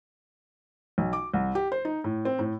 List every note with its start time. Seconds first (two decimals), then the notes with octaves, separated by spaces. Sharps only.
0.98 B1
1.13 D6
1.34 C2
1.55 G4
1.72 C5
1.85 D#4
2.04 A2
2.25 C4
2.39 A2